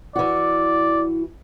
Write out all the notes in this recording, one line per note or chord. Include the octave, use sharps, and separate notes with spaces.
E3 F#4 D5